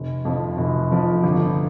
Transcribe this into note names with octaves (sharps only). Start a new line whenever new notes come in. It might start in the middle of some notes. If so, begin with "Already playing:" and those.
Already playing: F1
F2 F3
F1
F2 F3
G1